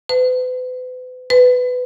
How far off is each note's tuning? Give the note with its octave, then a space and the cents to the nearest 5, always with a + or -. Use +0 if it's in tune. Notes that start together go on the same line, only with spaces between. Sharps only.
B4 +40
B4 +15